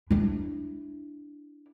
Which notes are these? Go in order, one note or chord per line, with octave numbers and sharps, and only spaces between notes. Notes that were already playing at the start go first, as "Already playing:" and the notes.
D4 E4